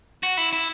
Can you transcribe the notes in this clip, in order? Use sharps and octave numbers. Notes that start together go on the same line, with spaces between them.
F#4
E4
E4